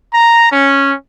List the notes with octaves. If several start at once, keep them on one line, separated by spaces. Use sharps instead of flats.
A#5
C#4